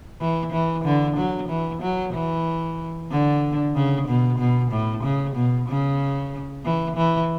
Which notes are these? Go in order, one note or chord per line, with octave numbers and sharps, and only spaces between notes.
E3
E3
D3
F#3
E3
F#3
E3
D3
C#3
B2
B2
A2
C#3
B2
C#3
E3
E3